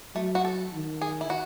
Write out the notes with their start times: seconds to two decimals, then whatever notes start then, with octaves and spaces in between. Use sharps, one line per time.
0.15 F#3 A3
0.35 F#4
0.45 A4
0.74 D#3
1.01 G#4
1.21 E4
1.30 F#4